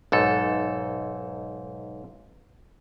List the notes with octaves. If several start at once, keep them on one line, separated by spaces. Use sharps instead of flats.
B1 G#2 A4